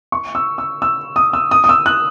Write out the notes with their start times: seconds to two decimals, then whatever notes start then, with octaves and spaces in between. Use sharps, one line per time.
0.12 C#6
0.35 E6
0.58 E6
0.82 E6
1.16 D#6
1.33 E6
1.51 D#6
1.64 D#6
1.69 E6
1.86 F#6